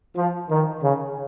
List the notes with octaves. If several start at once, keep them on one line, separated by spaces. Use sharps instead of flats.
F3
D#3
C#3